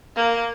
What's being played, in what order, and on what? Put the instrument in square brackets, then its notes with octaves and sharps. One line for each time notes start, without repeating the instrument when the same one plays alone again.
[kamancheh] A#3